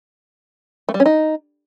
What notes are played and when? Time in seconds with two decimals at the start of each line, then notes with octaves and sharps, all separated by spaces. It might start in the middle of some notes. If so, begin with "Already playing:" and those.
0.89 A3
0.94 G3
1.00 C#4
1.06 D#4